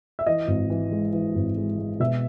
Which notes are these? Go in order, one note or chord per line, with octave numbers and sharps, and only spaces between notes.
E5
E3 D#5
G#1
E3
G#3
E3
G#1
G#3
G#3
B2 E5